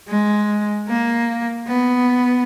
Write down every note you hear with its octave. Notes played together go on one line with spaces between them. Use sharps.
G#3
A#3
B3